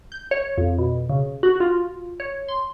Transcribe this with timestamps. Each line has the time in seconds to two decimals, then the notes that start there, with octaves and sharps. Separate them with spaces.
0.12 G6
0.31 C#5
0.58 F2
0.78 B2
1.10 C#3
1.43 F#4
1.60 F4
2.20 C#5
2.48 C6